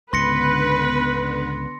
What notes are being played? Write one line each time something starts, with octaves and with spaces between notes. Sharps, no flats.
C#2 G#2 D3 B3 B4 C6 A#6 C#7